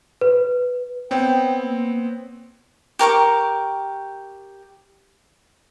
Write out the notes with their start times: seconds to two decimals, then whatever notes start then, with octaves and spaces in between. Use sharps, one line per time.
0.21 B4
1.11 B3 C4 C#5 G5
1.54 A#3
2.99 G4 A#4 C#6 D6